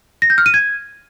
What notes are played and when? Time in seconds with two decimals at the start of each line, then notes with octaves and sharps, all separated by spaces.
0.22 A#6
0.30 G6
0.38 F6
0.46 D#7
0.54 G#6